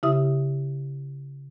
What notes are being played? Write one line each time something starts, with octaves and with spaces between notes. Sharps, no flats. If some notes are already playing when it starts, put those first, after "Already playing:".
C#3 E4 G4 E5 D#6